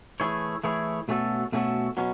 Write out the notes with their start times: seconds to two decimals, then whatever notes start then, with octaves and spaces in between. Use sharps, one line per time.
0.20 E3 A3 E4 G#4 C#5
0.64 E3 A3 E4 G#4 C#5
1.08 B2 A3 C#4 F#4 A4
1.52 B2 A3 C#4 F#4 A4
1.97 B2 F#3 C#4